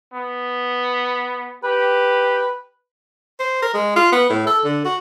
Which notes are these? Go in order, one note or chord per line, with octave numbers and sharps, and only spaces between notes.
B3
G4 B4
C5
A#4
G#3
F4
B3
A2
A4
D3
F#4